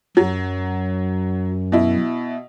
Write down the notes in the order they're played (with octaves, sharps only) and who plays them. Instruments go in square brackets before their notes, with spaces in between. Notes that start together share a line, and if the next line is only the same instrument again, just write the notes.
[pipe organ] F#2 [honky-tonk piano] F#3
[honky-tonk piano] B2 E4